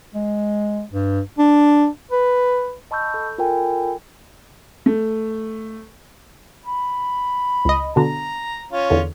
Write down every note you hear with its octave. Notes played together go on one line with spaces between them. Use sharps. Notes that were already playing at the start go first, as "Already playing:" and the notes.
G#3
G2
D4
B4
D#5 A5 B5 C#6 E6 G6
A4
F4 A4 A#4 G5 G#5
A3
B5
C#2 D#5
B2 D3 A#5
C#4 F4 C#5
E2 D3